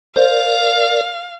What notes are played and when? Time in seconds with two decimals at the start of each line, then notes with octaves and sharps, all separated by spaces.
0.16 A#4 C5 D5 F5